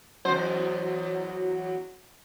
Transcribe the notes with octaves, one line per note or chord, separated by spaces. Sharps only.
E2 F#3 C5